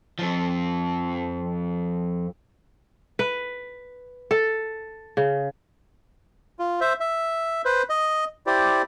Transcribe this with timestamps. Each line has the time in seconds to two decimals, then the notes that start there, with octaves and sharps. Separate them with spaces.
0.19 F2 F3
3.19 B4
4.31 A4
5.17 C#3
6.59 F4
6.81 C5 E5
7.00 E5
7.65 B4 C5
7.90 D#5
8.47 E4 G4 C5 D5